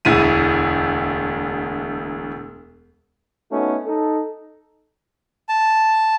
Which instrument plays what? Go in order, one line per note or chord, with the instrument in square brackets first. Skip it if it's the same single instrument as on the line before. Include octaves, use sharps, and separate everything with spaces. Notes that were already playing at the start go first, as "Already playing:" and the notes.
[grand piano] E1 D2 E4 D#7
[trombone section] A3 B3 C#4 D#4 F#4
D#4 A4
[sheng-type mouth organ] A5